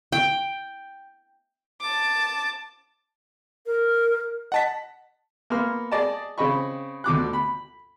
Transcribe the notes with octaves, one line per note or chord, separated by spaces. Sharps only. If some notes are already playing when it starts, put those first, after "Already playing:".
G5
A5 D6
A#4
D#5 F#5 A5 B6
A#3 B3 C6 F6
G#4 D5 D#5 A5
C#3 C4 D#5 B5 C#6
D2 B2 D6 F#6
B5